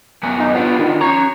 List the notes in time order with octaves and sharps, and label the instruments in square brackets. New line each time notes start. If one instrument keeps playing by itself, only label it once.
[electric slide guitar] F#2 B3 G#5
[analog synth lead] D#4
[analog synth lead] B3 [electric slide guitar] D4 F4 G4
[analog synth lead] D#3
[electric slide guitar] C#4 A#5 [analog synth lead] C#5